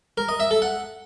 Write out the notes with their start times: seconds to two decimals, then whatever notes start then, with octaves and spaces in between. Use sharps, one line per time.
0.18 A#4
0.29 D#5
0.40 E5
0.51 A4
0.62 F#5